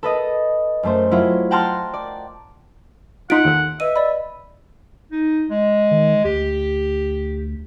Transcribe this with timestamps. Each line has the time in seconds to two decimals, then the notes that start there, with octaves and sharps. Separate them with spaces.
0.03 A4 B4 D#5
0.83 F#2 A3 C5
1.11 F#3 E4 F4
1.51 F#5 G5 A5 A#5 C6 F6
1.93 D5
3.30 D#4 F4 F#5 C6 B6 D7
3.45 D#2 A4
3.80 B4 D#5 E5 D#7
3.96 D5 D#5 B5
5.11 D#4
5.50 G#3
5.91 D#3
6.24 D2 G4